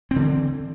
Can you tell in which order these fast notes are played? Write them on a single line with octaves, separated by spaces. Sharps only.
C4 D3 E3